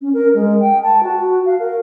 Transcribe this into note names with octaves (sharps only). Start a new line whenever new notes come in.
C#4
A#4
G#3
G5
A5
F#4
F5
A#4